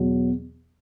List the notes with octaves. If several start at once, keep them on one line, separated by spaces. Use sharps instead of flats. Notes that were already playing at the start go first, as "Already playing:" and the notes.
Already playing: E2 B2 F#3